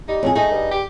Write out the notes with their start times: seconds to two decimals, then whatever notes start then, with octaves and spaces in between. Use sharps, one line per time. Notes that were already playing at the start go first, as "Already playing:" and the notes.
0.08 G3 D#4
0.23 F2 C#3 G#4
0.35 A3 D#4 G#4
0.51 G2
0.71 G4